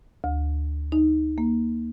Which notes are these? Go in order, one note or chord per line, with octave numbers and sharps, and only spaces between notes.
D2
D#4
A#3